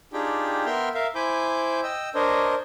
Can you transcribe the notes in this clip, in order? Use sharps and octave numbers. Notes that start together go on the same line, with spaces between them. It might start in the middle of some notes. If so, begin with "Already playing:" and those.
D4 D#4 F4 G4 G#4 G5
B3 A#4 E5 G5 C6 F6
A#4 E5 F5
E4 C5 G#5 B5 D6 G6
D#5 G5 E6
D4 A#4 C5 C#5 D#5